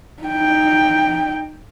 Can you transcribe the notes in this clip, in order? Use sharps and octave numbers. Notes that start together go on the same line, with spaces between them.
D#4 G5